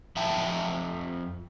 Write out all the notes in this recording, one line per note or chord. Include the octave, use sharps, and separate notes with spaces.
F2 E5 G5 A5